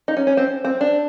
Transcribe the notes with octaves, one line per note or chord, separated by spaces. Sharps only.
D#4
C#4
C#4
C4
C4
D4